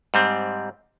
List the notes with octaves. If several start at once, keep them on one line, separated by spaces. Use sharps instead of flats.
G#2 G3 C4